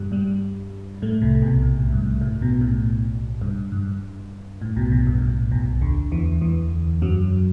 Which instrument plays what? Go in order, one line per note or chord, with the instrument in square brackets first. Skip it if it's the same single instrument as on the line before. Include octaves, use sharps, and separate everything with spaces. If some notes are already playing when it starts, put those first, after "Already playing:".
Already playing: [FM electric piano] G2 G3
G2 G3
A2 A3
C2 C3
B1 B2
A2
G2
A2
B1 B2
A2
G2
G2
A2
B1 B2
B1 B2
G2
A2
B1 B2
D2 D3
E2 E3
E2 E3
F#2 F#3